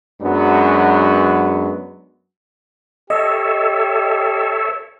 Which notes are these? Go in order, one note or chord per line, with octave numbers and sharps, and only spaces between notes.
F#2 F#3 G#3 B3 D4
G4 A4 C#5 D#5 E5